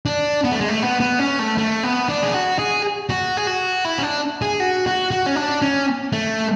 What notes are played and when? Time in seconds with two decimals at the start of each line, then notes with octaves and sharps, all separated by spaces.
0.06 D4
0.44 B3
0.52 A3
0.61 G#3
0.69 A3
0.82 B3
1.00 B3
1.19 C#4
1.39 A3
1.58 A3
1.83 B3
2.09 D4
2.23 G#4
2.34 F#4
2.59 G#4
3.10 F#4
3.37 G#4
3.47 F#4
3.85 E4
3.98 C#4
4.03 D4
4.42 G#4
4.60 F#4
4.86 F#4
5.11 F#4
5.26 C#4
5.36 D4
5.62 C#4
6.13 A3